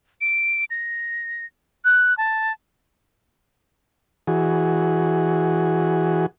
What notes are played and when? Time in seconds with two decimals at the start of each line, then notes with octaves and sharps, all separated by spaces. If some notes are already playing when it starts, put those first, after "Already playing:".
0.21 D7
0.70 A#6
1.85 F#6
2.18 A5
4.27 E3 F#4 G#4